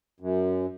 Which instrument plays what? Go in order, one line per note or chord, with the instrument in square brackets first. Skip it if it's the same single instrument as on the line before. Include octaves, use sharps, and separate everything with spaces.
[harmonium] F#2